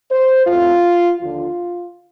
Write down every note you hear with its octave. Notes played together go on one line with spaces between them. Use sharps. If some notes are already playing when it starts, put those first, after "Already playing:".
C5
A2 A3 C4 F4
D#2 D3 F3 F4